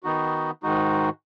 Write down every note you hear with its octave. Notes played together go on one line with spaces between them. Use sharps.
D#3 B3 D#4 F#4
G#2 D#3 G#3 D#4 F#4